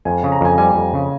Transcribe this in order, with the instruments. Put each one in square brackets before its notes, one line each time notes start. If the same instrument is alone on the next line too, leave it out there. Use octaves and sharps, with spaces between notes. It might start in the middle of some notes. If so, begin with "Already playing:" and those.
[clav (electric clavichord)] F2 [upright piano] G#5
[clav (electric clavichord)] C#3
[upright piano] A#5
[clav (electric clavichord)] F2 [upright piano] G#5
[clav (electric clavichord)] G3 [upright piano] G#5
[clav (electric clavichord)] F2
C#3